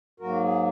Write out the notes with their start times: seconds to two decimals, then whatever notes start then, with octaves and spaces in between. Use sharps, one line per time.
0.20 G#2 F#3 A#3 F#4 A#4
0.41 G#4